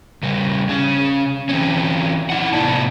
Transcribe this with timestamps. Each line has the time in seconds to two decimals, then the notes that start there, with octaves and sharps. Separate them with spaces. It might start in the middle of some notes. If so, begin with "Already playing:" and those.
0.23 C#3 G3
0.69 C#3 C#4
1.49 E3 C4 C#4
2.30 D#4 E4 F#5
2.53 A2 C3 B3 D5 A5